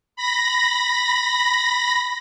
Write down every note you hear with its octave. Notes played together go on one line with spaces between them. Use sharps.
B5 A#6